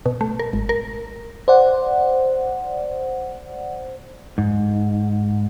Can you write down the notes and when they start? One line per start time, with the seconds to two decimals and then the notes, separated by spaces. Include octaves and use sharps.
0.06 B2
0.21 A3
0.39 A#4
0.53 G#1
0.69 A#4
1.48 C5 D5 F#5
4.38 G#2